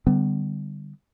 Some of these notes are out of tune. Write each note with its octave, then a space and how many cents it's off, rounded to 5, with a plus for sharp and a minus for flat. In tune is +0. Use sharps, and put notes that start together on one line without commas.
D3 +0 G3 +0 B3 +30